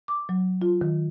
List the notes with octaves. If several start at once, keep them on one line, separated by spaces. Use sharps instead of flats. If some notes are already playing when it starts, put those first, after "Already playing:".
D6
F#3
F4
D#3